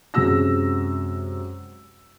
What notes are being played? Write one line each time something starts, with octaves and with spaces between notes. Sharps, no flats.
F#2 C3 G#3 F#4 E6 A#6